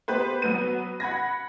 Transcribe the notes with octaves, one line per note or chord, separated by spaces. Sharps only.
B3 G4 B4 C5
F#3 B3 D#7
F#5 B5 G#6 A#6